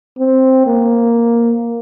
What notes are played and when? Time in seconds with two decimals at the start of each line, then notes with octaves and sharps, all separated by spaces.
0.18 C4
0.67 A#3